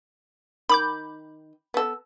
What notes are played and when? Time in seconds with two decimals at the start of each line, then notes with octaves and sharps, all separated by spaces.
0.69 D#3 B5 D6 G6
1.74 B3 A4